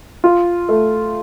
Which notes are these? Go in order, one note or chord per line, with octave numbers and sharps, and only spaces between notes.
F4
A3